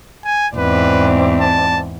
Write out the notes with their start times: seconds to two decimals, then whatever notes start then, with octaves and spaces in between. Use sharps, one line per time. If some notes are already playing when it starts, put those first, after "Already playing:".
0.24 G#5
0.56 E2 G#2 C4 B4 D5
1.40 A5